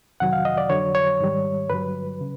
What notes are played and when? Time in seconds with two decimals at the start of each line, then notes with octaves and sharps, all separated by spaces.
0.20 F2 C3 D#3 F#3 F#5
0.33 F5
0.45 D#5
0.58 D5
0.70 F2 D3 F#3 C#5
0.95 C#5
1.20 G#2 D#3 G3
1.69 G2 D3 F#3 B4
2.21 C#3